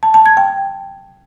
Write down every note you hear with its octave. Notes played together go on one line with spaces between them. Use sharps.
A5
A5
G#6
G5